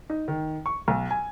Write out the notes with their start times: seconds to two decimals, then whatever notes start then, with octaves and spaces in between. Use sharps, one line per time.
0.10 D#4
0.28 D#3
0.66 C#6
0.88 B1
1.11 G#5